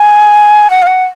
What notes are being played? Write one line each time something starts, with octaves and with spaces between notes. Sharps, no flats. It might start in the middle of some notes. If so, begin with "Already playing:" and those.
Already playing: G#5
F#5
F5
F#5